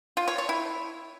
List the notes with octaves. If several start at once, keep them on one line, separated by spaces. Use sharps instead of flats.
F4
C#5
C#5
E4